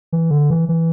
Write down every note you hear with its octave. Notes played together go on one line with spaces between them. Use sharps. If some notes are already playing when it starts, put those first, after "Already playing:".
E3
D3
E3
E3